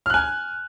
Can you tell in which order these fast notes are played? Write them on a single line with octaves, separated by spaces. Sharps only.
F6 F#6 G#5